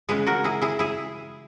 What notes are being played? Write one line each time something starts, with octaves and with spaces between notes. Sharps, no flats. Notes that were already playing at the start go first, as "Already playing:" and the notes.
C#3 E3 G#3 G#4 B4
F#4 A#4
E4 G#4
E4 G#4
E4 G#4